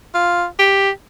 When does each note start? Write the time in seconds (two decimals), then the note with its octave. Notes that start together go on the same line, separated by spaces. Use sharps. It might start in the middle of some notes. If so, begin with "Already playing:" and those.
0.14 F4
0.59 G4